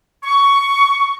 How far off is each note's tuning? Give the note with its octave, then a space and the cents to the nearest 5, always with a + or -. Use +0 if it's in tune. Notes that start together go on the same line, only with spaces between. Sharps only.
C#6 +10